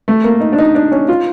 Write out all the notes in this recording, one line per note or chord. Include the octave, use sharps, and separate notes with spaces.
A3
A#3
D#4
D4
D#4
D4
C#4
F4